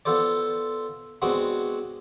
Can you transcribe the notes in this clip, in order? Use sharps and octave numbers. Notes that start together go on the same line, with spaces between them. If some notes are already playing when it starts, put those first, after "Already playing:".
B3 F4 A4 C5 D5
G#3 B3 C4 D4 F#4